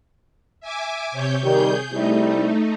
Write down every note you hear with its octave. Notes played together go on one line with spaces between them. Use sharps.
E5 G#5 D6
C3 C#5 G6
D#3 G3 G#4 G6
C3 G3 A3 D#4 E4